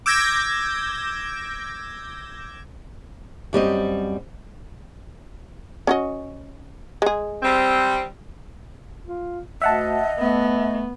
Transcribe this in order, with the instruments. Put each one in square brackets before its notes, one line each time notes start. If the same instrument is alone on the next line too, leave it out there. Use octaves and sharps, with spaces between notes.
[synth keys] D6 E6 G6 G#6 A#6
[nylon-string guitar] F#2 G3 C4 D#5
[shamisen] C#4 F#4 D#5
G#3 G#4
[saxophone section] G3 C4
[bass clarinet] F4
[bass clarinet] D2 [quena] D#5 [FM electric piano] E5 F#5 A5
[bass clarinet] A3 [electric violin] B3